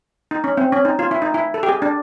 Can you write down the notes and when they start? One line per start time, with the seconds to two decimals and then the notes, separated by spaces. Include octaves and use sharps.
0.31 D#4
0.44 C#4
0.57 C4
0.72 C#4
0.85 D#4
0.99 F4
1.11 E4
1.22 D#4
1.34 E4
1.54 A4
1.63 G4
1.69 G#4
1.82 D4